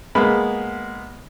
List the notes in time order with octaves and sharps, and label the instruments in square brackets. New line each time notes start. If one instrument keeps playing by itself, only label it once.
[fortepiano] G#3 A#3 B3 B5